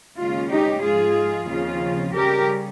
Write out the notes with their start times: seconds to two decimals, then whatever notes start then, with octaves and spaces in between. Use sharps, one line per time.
0.18 D#2 C#3 G#3 C#4 F4
0.50 D#4 G4
0.83 G#2 F3 G#3 F4 G#4
1.48 D#2 C#3 F3 C4 F4
2.14 C#3 G3 C#4 G4 A#4